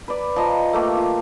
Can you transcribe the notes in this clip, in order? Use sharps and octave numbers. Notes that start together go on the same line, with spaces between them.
B4 D5
F3 D#5 A#5
A3 A#3 G4
F4